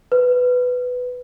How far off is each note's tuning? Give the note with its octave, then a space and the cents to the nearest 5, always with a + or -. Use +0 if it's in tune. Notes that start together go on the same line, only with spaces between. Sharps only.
B4 +10